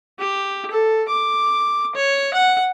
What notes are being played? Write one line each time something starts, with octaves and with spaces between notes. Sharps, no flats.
G4
A4
D6
C#5
F#5